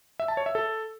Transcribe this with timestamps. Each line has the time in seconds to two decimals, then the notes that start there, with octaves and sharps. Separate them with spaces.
0.20 E5
0.28 A5
0.37 C#5
0.46 E5
0.55 A4